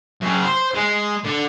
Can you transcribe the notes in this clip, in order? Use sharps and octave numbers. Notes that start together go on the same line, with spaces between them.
F#2 C#3
C5
G#3
D3